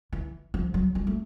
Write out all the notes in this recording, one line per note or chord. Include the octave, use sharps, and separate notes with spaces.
E3
F3
F#3
G3
A3